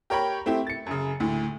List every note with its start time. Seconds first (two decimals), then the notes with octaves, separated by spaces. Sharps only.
0.10 G4 A#4 C#5 G5 B5
0.46 A3 C4 E4 G4
0.67 A6 C#7
0.86 F#2 C#3
1.20 D2 A2